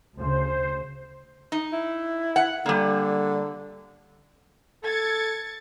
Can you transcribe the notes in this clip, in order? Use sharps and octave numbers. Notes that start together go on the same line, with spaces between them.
D2 C#3 C5
D#4
E4
F#5
D3 G3 A#3
A4 G#6 A6 C#7